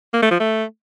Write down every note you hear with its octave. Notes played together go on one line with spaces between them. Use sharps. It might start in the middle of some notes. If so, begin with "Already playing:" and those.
A#3
A3
F3
A3